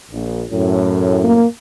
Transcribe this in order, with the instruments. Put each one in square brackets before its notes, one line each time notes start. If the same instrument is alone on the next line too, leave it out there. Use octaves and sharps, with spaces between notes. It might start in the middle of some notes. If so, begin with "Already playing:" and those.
[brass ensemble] A#1
F#2 A2
[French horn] A#3